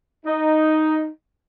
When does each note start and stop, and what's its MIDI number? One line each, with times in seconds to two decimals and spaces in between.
0.25 1.08 63